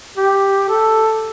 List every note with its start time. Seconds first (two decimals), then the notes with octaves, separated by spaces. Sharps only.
0.17 G4
0.69 A4